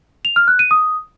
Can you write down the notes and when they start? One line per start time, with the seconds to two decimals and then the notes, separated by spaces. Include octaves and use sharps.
0.25 F7
0.36 F6
0.48 F#6
0.59 D#7
0.71 D#6